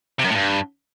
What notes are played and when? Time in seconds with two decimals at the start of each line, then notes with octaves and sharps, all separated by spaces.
0.19 C3
0.24 F#2
0.30 A2
0.35 G2